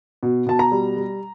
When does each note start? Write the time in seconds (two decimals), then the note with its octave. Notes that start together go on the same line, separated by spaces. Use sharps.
0.23 B2
0.46 B2 A5
0.59 A#5
0.72 G3
0.97 G3